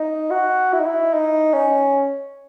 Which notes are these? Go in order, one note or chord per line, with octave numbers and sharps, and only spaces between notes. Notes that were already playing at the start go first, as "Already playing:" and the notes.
Already playing: D#4
F#4
E4
D#4
E4
D#4
C#4